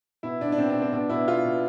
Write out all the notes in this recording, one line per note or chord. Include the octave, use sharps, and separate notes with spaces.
B2 E4
B2 D4
D4
B2 C4
D4
B2
C4
B2 D4
B2 E4
B2 F4
B2